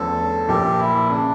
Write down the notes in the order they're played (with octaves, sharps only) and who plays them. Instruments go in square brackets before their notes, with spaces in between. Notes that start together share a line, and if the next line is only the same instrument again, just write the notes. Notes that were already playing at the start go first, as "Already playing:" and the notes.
Already playing: [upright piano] E2 D3 F3 A3 C#4 [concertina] A4
[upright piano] A#1 A#2 F3 A#3 [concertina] G4
[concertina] E4
[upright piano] C#3 [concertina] D4